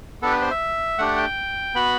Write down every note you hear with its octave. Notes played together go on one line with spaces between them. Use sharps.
B3 D4 G4 A4
B4
C5
E5
A3 D4 G4 F#5
G5
B3 F#4 B5